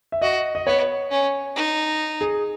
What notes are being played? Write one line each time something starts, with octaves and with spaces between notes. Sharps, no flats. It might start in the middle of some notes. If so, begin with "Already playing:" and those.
E5
F#4 D#5
D#5
B3 C#5
C#4
D#4
G#4